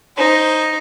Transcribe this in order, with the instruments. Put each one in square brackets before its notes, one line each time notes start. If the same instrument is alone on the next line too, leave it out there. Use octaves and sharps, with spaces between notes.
[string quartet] D#4 C5